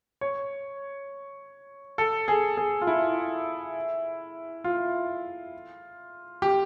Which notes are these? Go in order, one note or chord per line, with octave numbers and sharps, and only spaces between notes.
C#5
A4
G#4
G#4
F4
E4
F4
G4